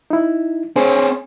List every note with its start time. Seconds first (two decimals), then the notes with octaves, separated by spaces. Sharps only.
0.10 D#4 E4
0.76 C4 G#4 C5 C#5